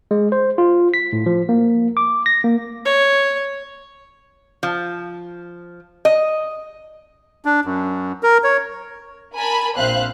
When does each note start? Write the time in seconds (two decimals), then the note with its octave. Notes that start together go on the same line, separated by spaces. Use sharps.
0.11 G#3
0.32 C5
0.58 F4
0.94 B6
1.13 A2
1.26 F3
1.49 A#3
1.97 D6
2.26 A#6
2.44 A#3
2.86 C#5
4.63 F3
6.05 D#5
7.45 D4
7.65 F#2
8.23 A#4
8.44 C#5
9.35 A#4 G#5 A5 B5
9.77 A#1 C4 C5 E5 F5 F#6